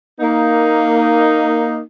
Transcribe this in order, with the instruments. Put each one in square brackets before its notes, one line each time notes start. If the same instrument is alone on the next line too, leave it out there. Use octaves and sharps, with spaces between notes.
[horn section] A#3 D#4